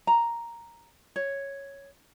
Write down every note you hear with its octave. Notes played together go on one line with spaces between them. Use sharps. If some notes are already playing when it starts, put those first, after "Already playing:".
A#5
C#5